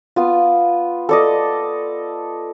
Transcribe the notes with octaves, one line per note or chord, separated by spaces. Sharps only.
B3 F4
A4 D5 D#5